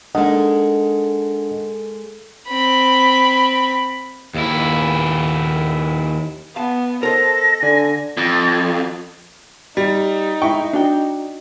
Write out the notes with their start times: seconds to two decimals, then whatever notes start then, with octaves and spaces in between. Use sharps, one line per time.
0.15 G#3 A#3 D4 D#4 A4 D#5 F#5
2.48 C4 B5
4.34 D#2 E4
6.56 B3 F5 A5
7.03 A4 A#4 C5 D#5 A#6
7.63 D3 D4 G#5
8.17 F2
9.77 G3 D#4
10.42 G#3 E4 G5 C#6
10.73 D4 F#4 G5